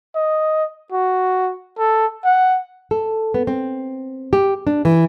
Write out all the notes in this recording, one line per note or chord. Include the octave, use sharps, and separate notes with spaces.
D#5
F#4
A4
F#5
A4
B3
C4
G4
D4
E3